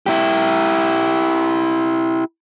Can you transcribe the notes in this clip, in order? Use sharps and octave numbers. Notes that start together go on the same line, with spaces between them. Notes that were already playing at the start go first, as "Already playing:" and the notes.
E4 G4